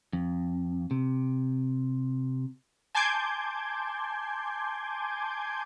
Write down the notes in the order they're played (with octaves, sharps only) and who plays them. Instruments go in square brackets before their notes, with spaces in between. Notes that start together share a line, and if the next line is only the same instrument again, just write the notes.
[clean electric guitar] F2
C3
[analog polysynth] G#5 A5 C6 D6 G6 G#6